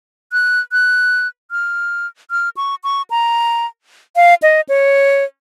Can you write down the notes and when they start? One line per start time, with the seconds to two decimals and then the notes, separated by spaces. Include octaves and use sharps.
0.32 F#6
0.72 F#6
1.51 F6
2.31 F6
2.57 C#6
2.84 C#6
3.10 A#5
4.16 F5
4.42 D#5
4.69 C#5